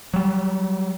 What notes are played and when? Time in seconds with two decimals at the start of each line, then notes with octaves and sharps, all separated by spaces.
0.14 F#3 G3